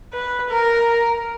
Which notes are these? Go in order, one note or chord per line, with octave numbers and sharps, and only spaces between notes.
B4
A#4